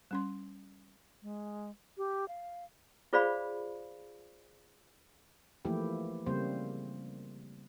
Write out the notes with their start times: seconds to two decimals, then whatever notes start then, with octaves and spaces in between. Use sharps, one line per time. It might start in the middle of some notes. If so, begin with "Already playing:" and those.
0.11 G3 C#4 C6
1.22 G#3
1.98 G4
2.28 F5
3.13 F4 G#4 C5 D5 F5 B5
5.65 E3 F3 A3 A#3 E4 G4
6.26 C#3 G3 A#3 C4 C5